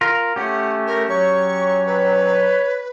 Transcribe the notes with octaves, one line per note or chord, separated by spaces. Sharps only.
F4 A#4
A3 C#4 G4 F#5
A#4
F#3 C#5 C#6
B4